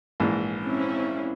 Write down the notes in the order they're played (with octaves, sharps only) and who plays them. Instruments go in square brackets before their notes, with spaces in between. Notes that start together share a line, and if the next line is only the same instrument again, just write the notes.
[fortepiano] A#1 G#2 E3
[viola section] C4 C#4 E4